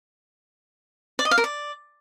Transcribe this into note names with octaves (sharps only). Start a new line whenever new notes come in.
D5
D#5
F5
A#4
D5